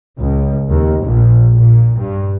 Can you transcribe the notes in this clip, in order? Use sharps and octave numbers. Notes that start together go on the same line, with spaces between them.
C#2
D#2
A#1
A#2
G2